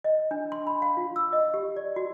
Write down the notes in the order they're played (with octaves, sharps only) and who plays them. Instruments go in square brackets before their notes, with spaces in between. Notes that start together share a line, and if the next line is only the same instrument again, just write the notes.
[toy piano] D#5
D4
C6
B5
F5
F4
E6
D#5
G4
D5
F#4